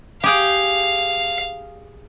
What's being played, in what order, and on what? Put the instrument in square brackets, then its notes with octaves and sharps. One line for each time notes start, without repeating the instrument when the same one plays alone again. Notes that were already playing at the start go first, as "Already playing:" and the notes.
[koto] G4 G#4 G5 [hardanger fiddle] F5